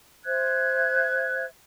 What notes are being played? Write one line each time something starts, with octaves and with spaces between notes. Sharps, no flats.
C5 E5 F#6 G#6